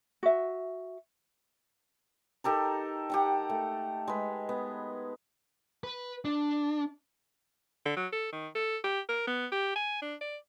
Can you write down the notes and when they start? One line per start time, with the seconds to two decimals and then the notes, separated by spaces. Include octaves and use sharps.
0.23 F#4 E5
2.44 D#4 G4 A4 A#4
3.10 G4 F#5 G5
3.50 A3
4.08 G#3 B4
4.49 B3
5.84 B4
6.25 D4
7.86 D3
7.97 F#3
8.12 A4
8.32 D#3
8.55 A4
8.84 G4
9.09 A#4
9.27 B3
9.52 G4
9.76 G#5
10.02 D4
10.21 D5